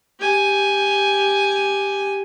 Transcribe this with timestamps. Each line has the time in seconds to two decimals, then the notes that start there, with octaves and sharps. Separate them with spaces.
0.20 G4 G#5